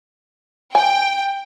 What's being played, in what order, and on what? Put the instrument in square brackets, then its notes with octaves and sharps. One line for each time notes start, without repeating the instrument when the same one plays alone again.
[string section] G5 [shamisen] G#5